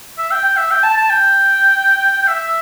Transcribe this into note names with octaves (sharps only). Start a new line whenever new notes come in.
E5
G5
G5
E5
G5
A5
A5
G5
E5